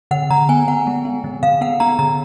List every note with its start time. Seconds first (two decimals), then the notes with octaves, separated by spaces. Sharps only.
0.11 D3 F#5
0.30 D3 A#5
0.49 B3 G#5
0.68 B3 F#5
0.87 G#3
1.05 B3
1.24 D3
1.43 D3 F5
1.61 B3 F#5
1.80 B3 A#5
1.99 D3 A#5